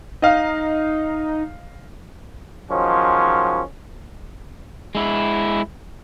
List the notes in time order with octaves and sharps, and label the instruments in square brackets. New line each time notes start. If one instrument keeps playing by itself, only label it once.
[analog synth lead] D#4 [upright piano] D#5 F5
[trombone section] D#3 F3 F#3 G#3 C#4
[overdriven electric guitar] G#3 E4